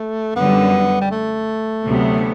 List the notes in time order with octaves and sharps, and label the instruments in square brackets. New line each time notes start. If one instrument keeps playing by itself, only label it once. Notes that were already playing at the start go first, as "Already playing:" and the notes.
Already playing: [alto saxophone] A3
[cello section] F#2 D3 G3 [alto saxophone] B3
[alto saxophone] G3
A3
[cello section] D2 C3 F#3 B3